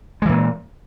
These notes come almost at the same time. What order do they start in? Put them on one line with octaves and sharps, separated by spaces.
G#3 E3 A#2